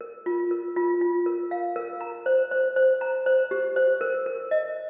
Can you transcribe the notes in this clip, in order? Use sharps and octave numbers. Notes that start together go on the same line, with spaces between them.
A#4
F4
A#4
F4
F4
A#4
F5
A#4
A#5
C5
C5
C5
A#5
C5
G4
C5
A#4
A#4
D#5